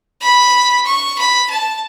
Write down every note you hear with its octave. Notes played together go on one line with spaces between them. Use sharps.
B5
C#6
B5
A5